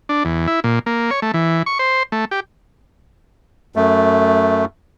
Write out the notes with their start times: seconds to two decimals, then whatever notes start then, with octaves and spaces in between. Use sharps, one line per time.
0.09 D4
0.25 E2
0.47 E4
0.64 A#2
0.86 A#3
1.11 C#5
1.22 A3
1.34 E3
1.66 C#6
1.79 C5
2.12 A3
2.31 G4
3.76 F#2 A3